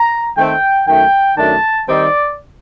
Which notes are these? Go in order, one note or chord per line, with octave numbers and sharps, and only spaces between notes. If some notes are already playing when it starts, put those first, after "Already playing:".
Already playing: A#5
D#3 A3 C4 G5
F#2 D#3 A3 G5
F#2 D#3 A3 D4 A5
D#3 G3 C4 D#4 D5